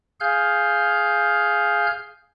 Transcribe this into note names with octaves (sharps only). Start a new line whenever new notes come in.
G#4 F5 F6 G6